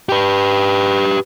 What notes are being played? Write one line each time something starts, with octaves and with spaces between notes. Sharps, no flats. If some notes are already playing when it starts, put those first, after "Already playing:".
G4 B4